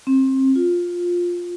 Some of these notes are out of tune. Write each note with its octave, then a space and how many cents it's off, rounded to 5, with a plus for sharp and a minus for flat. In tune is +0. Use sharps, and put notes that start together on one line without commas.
C4 +30
F4 +10